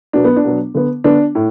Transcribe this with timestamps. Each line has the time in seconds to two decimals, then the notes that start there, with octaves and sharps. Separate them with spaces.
0.13 B2 F#3 B3 D4
0.24 B3
0.36 D4
0.44 B2 F#3 B3
0.75 D3 B3
1.04 D3 B3 D4
1.35 A2